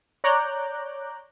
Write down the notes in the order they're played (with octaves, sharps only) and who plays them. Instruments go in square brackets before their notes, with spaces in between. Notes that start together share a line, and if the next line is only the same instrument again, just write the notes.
[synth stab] C#5 D5 A#5 D6 F#6 G6